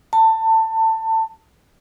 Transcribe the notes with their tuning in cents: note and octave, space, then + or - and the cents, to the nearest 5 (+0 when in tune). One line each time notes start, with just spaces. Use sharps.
A5 +20